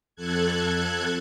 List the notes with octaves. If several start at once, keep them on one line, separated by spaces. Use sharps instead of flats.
F2 A4 F#6 G#6